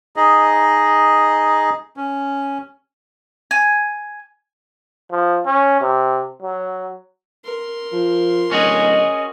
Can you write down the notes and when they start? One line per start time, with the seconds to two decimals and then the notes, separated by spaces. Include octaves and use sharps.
0.16 D#4 G#4 D#5
1.97 C#4
3.51 G#5
5.12 F3
5.46 C#4
5.81 C3
6.42 F#3
7.44 A#4 C6
7.92 F3
8.51 D1 C#4 F#4 G#4 D#5